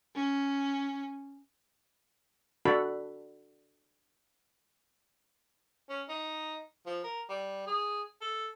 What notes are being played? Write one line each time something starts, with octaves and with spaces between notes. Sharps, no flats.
C#4
D4 F#4 A4 B5
C#4
D#4
F3
A#4
G3
G#4
A4